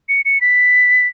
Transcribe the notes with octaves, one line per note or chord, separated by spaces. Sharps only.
C#7
C#7
B6